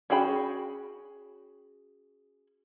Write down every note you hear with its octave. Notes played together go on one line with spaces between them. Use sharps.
C#4 F#4 G#4 G5 B5